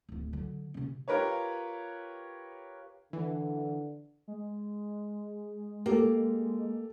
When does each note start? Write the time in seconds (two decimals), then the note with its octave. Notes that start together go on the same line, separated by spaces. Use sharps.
0.09 D1 A1
0.33 D3 F#3
0.74 C3 C#4
1.08 F4 G4 A#4 B4 C#5
3.13 D3 E3
4.28 G#3
5.86 A#3 G4 A4